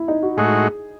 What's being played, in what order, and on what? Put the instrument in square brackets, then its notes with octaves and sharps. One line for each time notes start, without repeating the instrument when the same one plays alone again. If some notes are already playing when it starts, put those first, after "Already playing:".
Already playing: [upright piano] E4
D#4
F#4
[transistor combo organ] A2 G#3 D#4 F#4 [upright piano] G#4